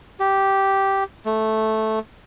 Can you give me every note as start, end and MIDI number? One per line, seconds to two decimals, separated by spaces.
0.20 1.04 67
1.26 1.99 57